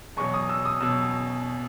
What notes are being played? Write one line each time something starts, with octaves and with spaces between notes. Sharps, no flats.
E2 B2 F#3 C#6
D#6
E6
D#6
B2 F#3 E6